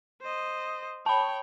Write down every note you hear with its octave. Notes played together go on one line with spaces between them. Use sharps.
C5 D#5
C#5 G5 A5 B5